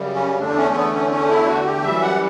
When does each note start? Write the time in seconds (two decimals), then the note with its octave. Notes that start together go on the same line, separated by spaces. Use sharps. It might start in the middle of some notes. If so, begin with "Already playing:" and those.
Already playing: F#2 C#3 G3
0.14 C#4
0.39 E2 D3 A3 D4
0.57 C#4
0.75 B3
0.92 C#4
1.11 C#4
1.29 E4
1.48 F#4
1.66 G4
1.83 F#2 E3 G3 E5
2.01 F#5